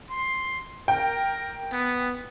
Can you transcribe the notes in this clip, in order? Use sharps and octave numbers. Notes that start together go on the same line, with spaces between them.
C6
A#4 G5
B3